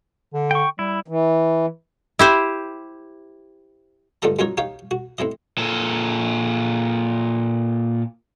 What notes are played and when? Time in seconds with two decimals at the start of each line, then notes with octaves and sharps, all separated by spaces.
0.34 D3
0.51 G5 C#6
0.79 G3 E4
1.08 E3
2.19 E4 G4 C5
4.22 G2 A#2 D3 A3 D#5 A#5
4.39 F#2 A#2 F#3 D#4 A#4 C#5
4.57 D#4 G4 C#5 F5 G5
4.91 F#4
5.18 A2 C4 E4 D#5
5.58 A#2 A4